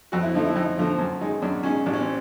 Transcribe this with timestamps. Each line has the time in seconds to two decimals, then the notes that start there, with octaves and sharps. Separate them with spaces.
0.12 F2 F#4
0.23 E4
0.34 D3 F3 A3 D#4
0.45 E4
0.56 F2 D#4
0.78 D3 F3 A3
0.98 F#2
1.21 D#3 G#3
1.42 F#2 D4
1.63 D#3 G#3 C#4
1.86 A1 D4
1.93 C#4
2.01 C4